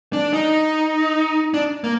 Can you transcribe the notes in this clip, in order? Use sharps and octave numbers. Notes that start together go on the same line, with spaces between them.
D4
D#4
D4
A#3